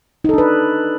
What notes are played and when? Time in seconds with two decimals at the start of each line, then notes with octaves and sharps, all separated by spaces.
0.24 D#4
0.29 A4
0.34 D4
0.38 B4